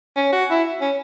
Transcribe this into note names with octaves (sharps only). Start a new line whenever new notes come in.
C#4
F#4
E4
C#4